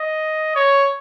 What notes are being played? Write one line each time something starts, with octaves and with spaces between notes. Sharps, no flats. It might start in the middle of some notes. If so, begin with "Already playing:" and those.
Already playing: D#5
C#5